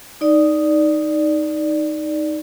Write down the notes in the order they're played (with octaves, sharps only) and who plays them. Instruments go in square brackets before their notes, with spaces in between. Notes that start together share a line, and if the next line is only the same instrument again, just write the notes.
[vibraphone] D#4 D5